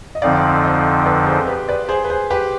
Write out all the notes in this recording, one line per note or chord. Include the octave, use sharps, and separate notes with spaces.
D#5
F2 D3 F3 C4 D#4 D5 F5
C5 D#5
B4 D5
G#4 C5
G4 B4
B4 D5
G#4 C5
B4
G#4 C5
G4 B4